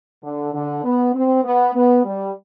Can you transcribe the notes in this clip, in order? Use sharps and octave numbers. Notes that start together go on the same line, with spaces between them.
D3
D3
B3
C4
B3
B3
G3